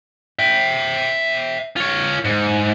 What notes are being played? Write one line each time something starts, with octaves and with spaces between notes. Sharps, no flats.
E5 G5
F4 C#5
G#2